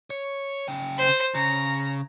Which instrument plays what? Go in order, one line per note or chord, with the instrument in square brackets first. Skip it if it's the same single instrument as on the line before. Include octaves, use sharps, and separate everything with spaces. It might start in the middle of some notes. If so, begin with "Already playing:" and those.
[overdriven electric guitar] C#5
C#3 G5
[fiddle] C5
[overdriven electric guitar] C#3 [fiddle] A#5